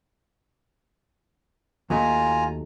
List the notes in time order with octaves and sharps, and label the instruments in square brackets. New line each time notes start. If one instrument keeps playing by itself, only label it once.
[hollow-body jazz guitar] D#2 F#3 A3 [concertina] F4 G#5 A#5